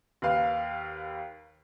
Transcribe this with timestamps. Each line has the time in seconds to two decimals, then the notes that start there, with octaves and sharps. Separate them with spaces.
0.22 D#2 B4 F5